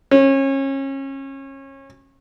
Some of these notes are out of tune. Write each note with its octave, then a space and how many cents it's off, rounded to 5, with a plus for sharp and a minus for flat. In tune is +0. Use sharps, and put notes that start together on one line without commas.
C#4 -30